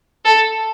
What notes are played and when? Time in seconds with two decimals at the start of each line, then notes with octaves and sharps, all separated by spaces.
0.25 A4